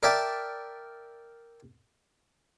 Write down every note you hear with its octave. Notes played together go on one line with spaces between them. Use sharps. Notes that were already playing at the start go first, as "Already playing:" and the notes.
A#4 D5 E5 G5 A5